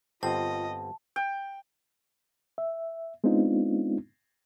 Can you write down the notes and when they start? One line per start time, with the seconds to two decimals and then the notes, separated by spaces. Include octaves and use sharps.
0.23 G1 C4 F4 D#5 A5
1.16 G5
2.58 E5
3.24 G#3 B3 C4 D4 D#4 F4